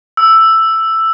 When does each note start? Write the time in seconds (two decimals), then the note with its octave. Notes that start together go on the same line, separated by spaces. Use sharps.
0.17 E6